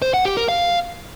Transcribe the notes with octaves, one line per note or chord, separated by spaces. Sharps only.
C5
F#5
G4
A#4
F5